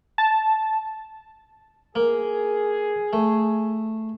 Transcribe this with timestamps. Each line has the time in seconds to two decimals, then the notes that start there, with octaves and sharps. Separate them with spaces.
0.18 A5
1.96 A#3 G#4
3.13 A3